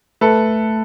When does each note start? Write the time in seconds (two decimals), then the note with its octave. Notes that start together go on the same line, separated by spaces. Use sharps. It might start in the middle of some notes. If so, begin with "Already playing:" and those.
0.21 A3 A4 B4